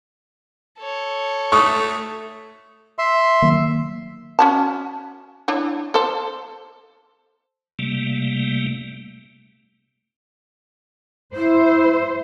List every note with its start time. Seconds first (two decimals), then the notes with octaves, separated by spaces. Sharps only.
0.79 A4 C#5
1.52 A3 C#6 D#6
2.99 E5 C6
3.42 D#3 F#3 A#3
4.39 C#4 F#4 A5
5.48 D4 E4 C#5
5.94 A4 C5
7.79 C3 G3 A3 A#3
11.35 E4 C5